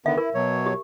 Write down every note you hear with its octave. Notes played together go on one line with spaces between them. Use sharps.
D3 D#3 B3 E5
E4 A#4
B2 F#3 C#5
G4